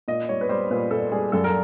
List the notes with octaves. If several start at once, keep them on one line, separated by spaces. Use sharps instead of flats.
A#2 D#5
G3 C#5
B4
G3 C5
A#2 B4
A#2 A4
G3 G#4
F#2 A4
A#4